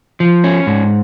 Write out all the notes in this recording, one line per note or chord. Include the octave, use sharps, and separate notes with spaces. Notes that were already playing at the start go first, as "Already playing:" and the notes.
F3
C#4
G#2